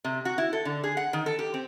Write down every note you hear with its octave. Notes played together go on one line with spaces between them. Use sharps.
C3
F#4
E4
A4
D3
G#4
F#5
D#3
A4
G4
C4